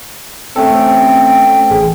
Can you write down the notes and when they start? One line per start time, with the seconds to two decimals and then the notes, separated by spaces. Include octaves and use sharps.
0.56 A3 C4 C#4 A4 G5
1.70 A1 G#4